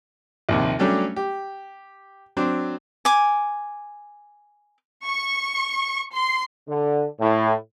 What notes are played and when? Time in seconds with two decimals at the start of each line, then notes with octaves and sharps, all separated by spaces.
0.49 A#1 D#2 C3
0.79 F#3 G3 A3 C#4 D4 G4
1.16 G4
2.37 F#3 C4 D4
3.05 G#5 D6
5.06 C#6
6.13 C6
6.68 D3
7.20 A2